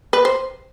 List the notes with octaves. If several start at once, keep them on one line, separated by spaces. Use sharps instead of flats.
B4
C5